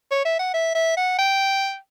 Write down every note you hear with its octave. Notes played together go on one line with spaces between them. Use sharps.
C#5
E5
F#5
E5
E5
F#5
G5